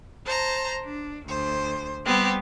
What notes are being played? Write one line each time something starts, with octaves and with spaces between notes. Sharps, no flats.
C5 A5 A#5
D4
D2 C5
G3 B3 C4 G4